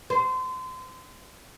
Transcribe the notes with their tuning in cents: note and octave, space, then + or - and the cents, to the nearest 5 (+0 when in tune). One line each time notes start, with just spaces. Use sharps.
C5 -30